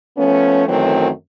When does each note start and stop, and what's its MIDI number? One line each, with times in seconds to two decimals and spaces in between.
0.17 0.66 53
0.17 0.66 57
0.17 0.66 59
0.17 0.66 61
0.68 1.10 42
0.68 1.10 51
0.68 1.10 52
0.68 1.10 54
0.68 1.10 57
0.68 1.10 60